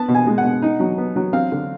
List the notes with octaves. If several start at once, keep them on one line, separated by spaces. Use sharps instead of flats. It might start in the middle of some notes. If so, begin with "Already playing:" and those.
Already playing: B3 A5
B2
G#5
G#3
F#5
B2
D#4
F#3
B3
F#3
C4 F5
D3